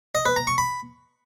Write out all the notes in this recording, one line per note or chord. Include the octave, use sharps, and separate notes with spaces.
D#5
B4
A#5
C#6
B5